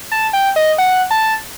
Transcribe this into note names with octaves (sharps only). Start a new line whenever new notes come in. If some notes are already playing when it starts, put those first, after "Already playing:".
A5
G5
D#5
F#5
A5